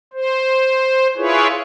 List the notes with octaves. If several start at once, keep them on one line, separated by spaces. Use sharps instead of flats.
C5
E4 F4 G#4 B4 C#5